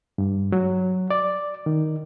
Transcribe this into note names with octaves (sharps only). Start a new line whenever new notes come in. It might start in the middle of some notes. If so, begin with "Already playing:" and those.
G2
F#3
D5
D#3